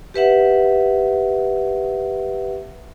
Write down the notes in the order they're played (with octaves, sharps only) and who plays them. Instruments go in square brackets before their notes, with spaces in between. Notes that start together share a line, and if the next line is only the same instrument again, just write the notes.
[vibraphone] G4 B4 E5 F#5